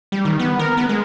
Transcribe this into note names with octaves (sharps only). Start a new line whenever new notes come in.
G3
D#3
B3
A#4
B3
G#3